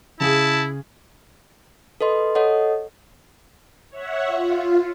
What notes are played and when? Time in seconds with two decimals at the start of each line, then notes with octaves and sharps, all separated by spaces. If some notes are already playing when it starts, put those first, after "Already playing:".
0.20 C#3 E4 G#4 A5
2.01 A4 B4 D#5 C6
2.35 A4 C#5 D#5 F#5
3.90 C#5 E5 F#5
4.26 F4